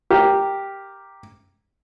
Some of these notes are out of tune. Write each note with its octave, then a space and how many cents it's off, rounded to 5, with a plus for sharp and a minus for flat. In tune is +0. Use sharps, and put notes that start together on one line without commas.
G4 +0 A#4 +0